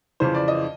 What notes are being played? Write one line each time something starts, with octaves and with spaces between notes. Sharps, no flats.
F2 C#3 E3 C5
D5
D#5